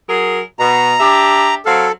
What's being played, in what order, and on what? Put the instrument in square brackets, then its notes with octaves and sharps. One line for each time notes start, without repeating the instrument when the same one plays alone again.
[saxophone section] F#3 G#4 A#4
[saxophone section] B2 [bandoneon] A#5
[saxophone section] D4 G4 E5
[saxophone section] F#3 C4 F5 [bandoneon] A4